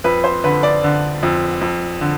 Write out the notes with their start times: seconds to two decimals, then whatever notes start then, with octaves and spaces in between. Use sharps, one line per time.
0.04 F2 B4
0.24 C5
0.44 D3 B4
0.63 D5
0.84 D3
1.23 F2
1.61 F2
2.01 D3